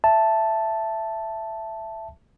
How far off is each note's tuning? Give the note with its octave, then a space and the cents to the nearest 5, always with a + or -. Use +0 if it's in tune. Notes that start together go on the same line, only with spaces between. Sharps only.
E5 +10 A5 +0